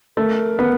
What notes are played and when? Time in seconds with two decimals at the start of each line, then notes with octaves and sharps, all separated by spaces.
0.17 A3 A#4
0.59 B3